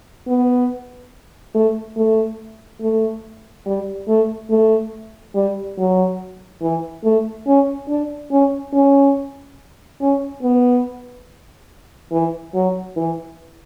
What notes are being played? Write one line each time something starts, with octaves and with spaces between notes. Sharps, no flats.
B3
A3
A3
A3
G3
A3
A3
G3
F#3
E3
A3
C#4
D4
C#4
C#4
C#4
B3
E3
F#3
E3